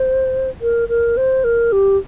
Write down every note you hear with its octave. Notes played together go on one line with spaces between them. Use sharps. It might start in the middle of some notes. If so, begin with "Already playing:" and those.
Already playing: C5
A#4
A#4
C5
A#4
G4